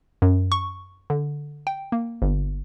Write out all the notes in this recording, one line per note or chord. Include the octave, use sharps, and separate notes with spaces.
F#2
C#6
D3
G5
A#3
G1